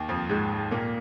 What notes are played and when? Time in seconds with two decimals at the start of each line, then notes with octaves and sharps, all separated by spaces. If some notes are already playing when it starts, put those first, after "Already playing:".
Already playing: D#2 D#3
0.09 F2 F3
0.29 G#2 G#3
0.71 A#2 A#3